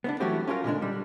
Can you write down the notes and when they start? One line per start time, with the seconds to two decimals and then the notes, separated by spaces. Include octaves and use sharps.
0.04 B3 C4 D4
0.20 E3 F#3 G3 A3 F#4 G4
0.47 C#4 F4 G4 A#4
0.64 A#2 D3 G#3 D4
0.82 G3